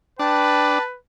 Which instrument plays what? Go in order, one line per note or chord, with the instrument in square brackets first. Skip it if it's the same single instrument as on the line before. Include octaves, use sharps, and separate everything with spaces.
[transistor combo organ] D4 [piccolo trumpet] B4 [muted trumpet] G5 [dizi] A5